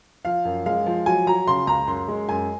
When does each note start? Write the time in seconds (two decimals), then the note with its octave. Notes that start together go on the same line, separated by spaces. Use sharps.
0.25 F3 F5
0.45 F#2
0.66 G#3 F5
0.86 F3
1.06 F#3 G#5
1.27 F#3 A#5
1.47 C#3 C6
1.67 C#2 A#5
1.87 F#2 C6
2.08 G#3
2.28 F#2 G#5